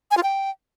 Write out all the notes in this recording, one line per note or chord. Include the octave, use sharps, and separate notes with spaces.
G#5
F4
G5